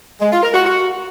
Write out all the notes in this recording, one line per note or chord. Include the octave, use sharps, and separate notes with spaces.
G#3
F4
A#4
F#4
F#4